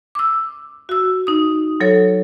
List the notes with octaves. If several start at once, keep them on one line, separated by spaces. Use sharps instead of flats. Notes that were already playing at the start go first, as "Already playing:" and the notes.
D6 E6
F#4 E6
D#4 D#6
F#3 A4 C#5